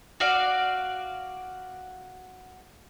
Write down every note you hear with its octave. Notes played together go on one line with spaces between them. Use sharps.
F#4 D5 F5